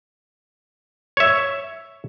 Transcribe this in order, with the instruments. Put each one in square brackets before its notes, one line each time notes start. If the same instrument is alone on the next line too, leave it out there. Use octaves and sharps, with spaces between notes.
[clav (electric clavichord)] C#5 E5